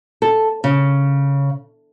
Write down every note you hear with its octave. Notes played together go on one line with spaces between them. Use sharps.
A4
C#3